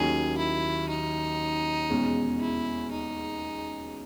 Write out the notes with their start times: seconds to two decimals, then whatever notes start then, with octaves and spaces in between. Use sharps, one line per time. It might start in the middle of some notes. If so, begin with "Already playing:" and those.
Already playing: D#2 D#3 F#3 C#4 G#4
0.38 E4
0.89 D#4
1.90 E2 B2 G#3 C#4
2.41 E4
2.91 D#4